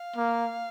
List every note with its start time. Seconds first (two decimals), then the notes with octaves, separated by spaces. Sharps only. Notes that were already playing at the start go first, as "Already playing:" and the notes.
Already playing: F5
0.16 A#3